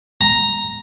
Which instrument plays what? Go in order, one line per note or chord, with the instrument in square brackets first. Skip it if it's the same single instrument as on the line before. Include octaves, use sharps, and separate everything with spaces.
[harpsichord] A#5